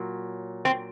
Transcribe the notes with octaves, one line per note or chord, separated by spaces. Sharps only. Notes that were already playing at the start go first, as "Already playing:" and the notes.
Already playing: A#2 F#3
C4